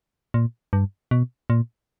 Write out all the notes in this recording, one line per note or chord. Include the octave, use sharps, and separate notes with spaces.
A#2
G2
B2
A#2